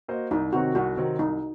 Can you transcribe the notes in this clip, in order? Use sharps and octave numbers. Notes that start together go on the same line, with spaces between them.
A#3 F#4 C5 D#5
C2 D#4
C3 D#3 F#3 C4 F#4
C2 F#4
C3 D#3 F#3 C4
C2 D#4